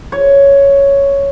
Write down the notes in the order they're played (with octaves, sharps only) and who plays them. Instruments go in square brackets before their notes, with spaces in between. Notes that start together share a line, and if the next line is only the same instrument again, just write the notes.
[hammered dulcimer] C#5